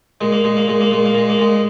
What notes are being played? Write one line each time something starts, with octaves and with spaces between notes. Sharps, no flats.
A#2 G#3
A#3
A#2 G#3
A#3
A#2 G#3
A#3
A#2 G#3
A#3
A#2 G#3
A#3
A#2 G#3